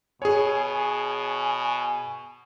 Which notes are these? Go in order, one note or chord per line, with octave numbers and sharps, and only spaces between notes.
B2 G#4 C#5 G#5